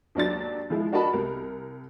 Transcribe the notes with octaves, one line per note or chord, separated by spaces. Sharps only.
D#2 F#3 D4 A6
F3 G#3 E4
D4 F#4 A#4 D#5 A5 B5
C2 A#4